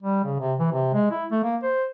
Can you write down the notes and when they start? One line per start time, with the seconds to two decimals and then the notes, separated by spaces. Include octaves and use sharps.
0.03 G3
0.24 C#3
0.39 C3
0.59 E3
0.72 C3
0.94 G#3
1.11 E4
1.31 A3
1.43 A#3
1.63 C5